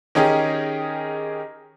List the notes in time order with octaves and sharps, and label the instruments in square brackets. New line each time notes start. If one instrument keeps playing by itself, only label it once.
[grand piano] D#3 C#4 D#4 G4 G#4